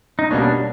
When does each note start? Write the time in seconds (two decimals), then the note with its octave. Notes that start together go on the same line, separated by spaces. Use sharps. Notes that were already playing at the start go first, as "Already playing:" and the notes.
0.19 D#4
0.30 B2 G3 A#3 C#4 D4